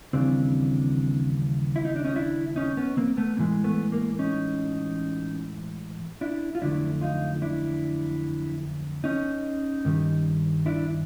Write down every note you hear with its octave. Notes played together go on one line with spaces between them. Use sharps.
D#2 C#3 E3 G3 C4 D4
E4
D#4
D4
C#4 D#4
D4 E4
C#4 D#4
B3 C#4
A#3 C4
A3 B3
A2 E3 G#3 A#3
A3 B3
A#3
C#4 D#4
D4 E4
F4
F2 D3 F#3 A3 D4 E4
D#4 F4
D4 E4
C#4 D#4
G2 D#3 G3
D4 E4